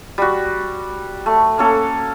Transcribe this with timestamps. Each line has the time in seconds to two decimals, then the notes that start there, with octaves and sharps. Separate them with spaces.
0.18 G3 F#4
1.26 A3
1.58 A#3 C#4 A4